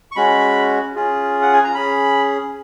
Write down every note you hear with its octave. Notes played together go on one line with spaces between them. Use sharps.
C#6
G#3 C#4 F#4 B5
C#4 F4 G#4
F#5
G#5
A#5
C#4 G#4 B5